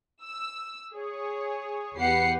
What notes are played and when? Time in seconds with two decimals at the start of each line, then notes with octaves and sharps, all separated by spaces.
0.24 E6
0.93 G#4 C#5
1.98 E2 G4 B4 F#5 C7 C#7